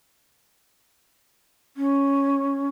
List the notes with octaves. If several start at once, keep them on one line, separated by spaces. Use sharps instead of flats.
C#4